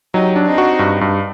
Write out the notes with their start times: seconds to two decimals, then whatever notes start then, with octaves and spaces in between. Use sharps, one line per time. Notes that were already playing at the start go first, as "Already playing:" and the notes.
0.13 F#3 D#4 G4
0.36 D4
0.46 C4 D#4
0.58 F#4
0.79 G2
1.01 G2